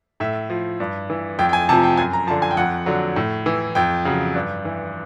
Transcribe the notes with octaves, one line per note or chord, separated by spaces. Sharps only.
A2 E5
F3
G2
E3
F2 G5
G5
G#5
C3 F3 A5
G5
F#2 G#5
A#5
D3 F3 A5
G#5
G5
F2 F#5
D3 F#3
A2
E3
F2 G5
C#3 F#3
G2
E3